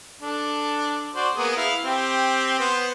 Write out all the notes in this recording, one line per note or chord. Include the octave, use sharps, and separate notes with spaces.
D4 A4
F#4 C5 D5
A#3 B3 G#4
E4 F5
C4 G4
B3 C5